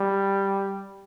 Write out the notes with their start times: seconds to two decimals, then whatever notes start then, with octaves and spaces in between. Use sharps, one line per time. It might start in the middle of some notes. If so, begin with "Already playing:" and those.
Already playing: G3